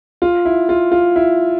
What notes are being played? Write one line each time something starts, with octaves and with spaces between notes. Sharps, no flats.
F4
E4
F4
F4
E4